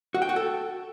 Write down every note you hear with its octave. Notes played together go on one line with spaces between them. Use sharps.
F#4
G5
F#4
A4